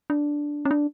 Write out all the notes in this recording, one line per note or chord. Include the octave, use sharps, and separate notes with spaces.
D4
C#4
D4